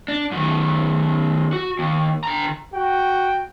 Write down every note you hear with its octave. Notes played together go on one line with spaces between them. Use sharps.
D4
F#2 D#3
F#4
D#2
D3 A#5
F#4 G5